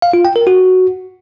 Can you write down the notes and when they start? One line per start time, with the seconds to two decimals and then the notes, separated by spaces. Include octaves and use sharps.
0.02 F5
0.13 F4
0.25 G5
0.36 A#4
0.47 F#4